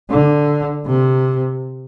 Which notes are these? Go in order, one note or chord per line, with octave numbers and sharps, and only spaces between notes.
D3
C3